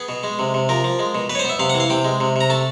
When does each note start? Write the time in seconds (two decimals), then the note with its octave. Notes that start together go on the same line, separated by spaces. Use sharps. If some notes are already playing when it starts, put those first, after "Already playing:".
Already playing: B3 G#4
0.09 B2
0.24 G#3
0.39 C3
0.54 C3
0.69 F3 A#4
0.84 F3
0.99 G#3
1.15 B2
1.30 B2 B4
1.35 C#5
1.39 C5
1.45 B3 E5
1.59 C3 F5
1.70 F#5
1.75 E3
1.80 F5
1.90 C3 G5
2.05 G#3
2.21 C3
2.36 C3 A#5
2.50 A3 A5